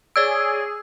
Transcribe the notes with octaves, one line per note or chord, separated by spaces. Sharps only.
G#4 C#5 D5 E6 G#6 D7